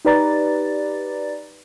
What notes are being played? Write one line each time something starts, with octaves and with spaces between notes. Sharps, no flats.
D#4 G4 B4 D5 A#5 A6